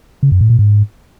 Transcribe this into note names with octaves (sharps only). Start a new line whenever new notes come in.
C#3
F#2
A2
A#2
G#2